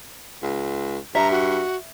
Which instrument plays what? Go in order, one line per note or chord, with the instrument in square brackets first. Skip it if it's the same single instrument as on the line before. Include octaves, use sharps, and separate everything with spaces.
[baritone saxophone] C#2
[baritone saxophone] G2 [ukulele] E5 [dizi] A#5
[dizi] F#4